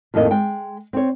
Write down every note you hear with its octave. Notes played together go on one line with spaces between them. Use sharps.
F2 A2 D#3 A#3 D#5
G#3 G5
C4 C#5